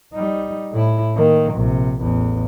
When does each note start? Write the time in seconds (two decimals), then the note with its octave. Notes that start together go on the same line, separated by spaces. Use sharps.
0.13 G3 D#4
0.72 A2 E4
1.15 D#3 A#3
1.54 A#1 C3
2.01 A1 E2